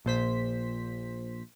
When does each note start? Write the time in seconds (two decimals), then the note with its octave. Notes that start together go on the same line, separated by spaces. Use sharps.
0.05 A#1 A#2 C5 B6